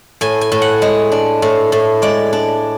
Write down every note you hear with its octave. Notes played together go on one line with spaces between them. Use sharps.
A2 G#5
G#5
A2
F#5
G#3
D4
A2
A2
G#3 D5
D4